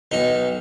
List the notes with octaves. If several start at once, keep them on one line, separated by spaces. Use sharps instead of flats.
B1 D#4